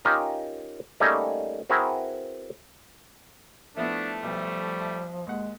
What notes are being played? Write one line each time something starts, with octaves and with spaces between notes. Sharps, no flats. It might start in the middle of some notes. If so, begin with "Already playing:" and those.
C#4 D#4 F4 G4 A#4
G3 A3 A#3 C#4 D#4 G#4
C4 E4 F#4 G#4 A#4 B4
F3 A3 B3 D4 E4
B1 F3 G3
D#2 G#3 F#5